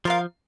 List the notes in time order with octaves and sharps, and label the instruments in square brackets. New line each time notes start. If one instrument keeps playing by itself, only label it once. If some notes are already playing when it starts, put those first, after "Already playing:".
[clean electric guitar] F3 [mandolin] F4 A#4 F5